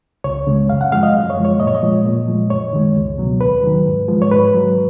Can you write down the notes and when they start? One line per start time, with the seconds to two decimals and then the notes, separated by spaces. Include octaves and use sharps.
0.24 C#2 C#5
0.47 C#3 G#3
0.69 F#2 F5
0.81 F#5
0.92 F3 G#3 F5
1.03 D#5
1.14 F#2
1.30 C#5
1.37 F3 G#3
1.45 C#5
1.60 A#2 D#5
1.67 C#5
1.74 D#5
1.83 F3 G#3
2.05 A#2
2.28 F3 G#3
2.50 F#2 C#5
2.73 D#3 G#3
2.96 C#2
3.18 B2 F#3
3.41 D#2 B4
3.63 D#3 F#3
3.86 G#2
4.08 F3 G#3
4.22 C#5
4.31 G#2 B4
4.54 F#3